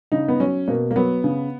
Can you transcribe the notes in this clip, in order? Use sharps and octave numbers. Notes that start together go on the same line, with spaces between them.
C#3 D#4
B3
F#3 C#4
B2 A#3
A#3
F#3 B3
C#3